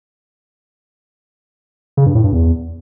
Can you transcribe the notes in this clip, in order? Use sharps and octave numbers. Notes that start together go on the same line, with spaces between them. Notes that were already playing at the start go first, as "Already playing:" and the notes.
C#3
G2
A2
G2
E2